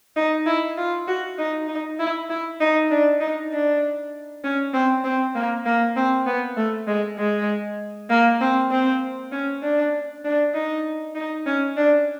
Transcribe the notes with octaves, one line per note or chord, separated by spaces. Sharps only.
D#4
E4
F4
F#4
D#4
D#4
E4
E4
D#4
D4
D#4
D4
C#4
C4
C4
A#3
A#3
C4
B3
A3
G#3
G#3
A#3
C4
C4
C#4
D4
D4
D#4
D#4
C#4
D4